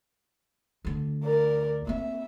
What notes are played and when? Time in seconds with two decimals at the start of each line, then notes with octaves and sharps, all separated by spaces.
0.85 D2 D3
1.24 A#4 D5
1.87 A#3 C4 E5